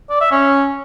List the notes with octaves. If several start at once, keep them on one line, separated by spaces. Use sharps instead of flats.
D5
E5
C#4